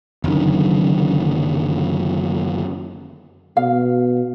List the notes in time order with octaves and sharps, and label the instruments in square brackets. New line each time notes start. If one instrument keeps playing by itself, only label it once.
[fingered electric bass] F#1 F#2 D3 D#3
[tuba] B2 [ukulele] F5